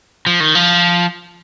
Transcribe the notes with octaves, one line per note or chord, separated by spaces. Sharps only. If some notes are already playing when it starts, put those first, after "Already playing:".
F3
D#3
F3